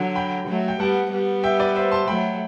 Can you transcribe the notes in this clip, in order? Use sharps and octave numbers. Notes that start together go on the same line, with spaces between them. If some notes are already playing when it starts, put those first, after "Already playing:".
Already playing: D3 F#3
G5 B5
F#3 A3
G5
G3 B3 F#5 A5
G3 B3
E5 G5
B4 D5
C5 E5
A5 C6
F#3 A3 G5 B5